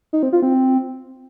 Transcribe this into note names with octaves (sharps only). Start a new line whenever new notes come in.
D#4
C4
F4
C4